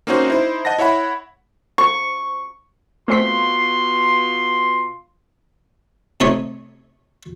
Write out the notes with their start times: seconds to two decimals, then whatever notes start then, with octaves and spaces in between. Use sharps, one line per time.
0.07 A#3 C4 C#4 D#4 F#4 C5
0.28 D#4 E4 C5
0.65 D#5 F#5 A5 A#6
0.78 E4 C#5 E5 F#5 B5
1.78 C#6
3.08 B2 A3 C4 F4 C6 B6
6.20 C3 A3 D#4 C#5 C#6 D#6